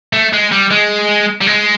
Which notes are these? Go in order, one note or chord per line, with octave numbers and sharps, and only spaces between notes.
A3
G#3
G3
G#3
G3
G#3